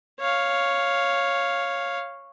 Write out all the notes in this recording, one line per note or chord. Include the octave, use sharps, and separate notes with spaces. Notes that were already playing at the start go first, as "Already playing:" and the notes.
C#5 F5